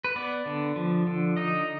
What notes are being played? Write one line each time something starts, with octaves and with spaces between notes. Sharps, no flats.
B4
B3 D5
D3
F3
D3
D#4 D#5